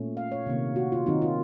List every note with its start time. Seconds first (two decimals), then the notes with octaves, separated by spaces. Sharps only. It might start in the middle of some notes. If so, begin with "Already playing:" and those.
Already playing: A#2 A3 C#4
0.17 F5
0.32 C#5
0.46 C3 D#3 A#3
0.76 F#4
0.92 F4
1.06 D#3 F#3 C4 D#4
1.22 F4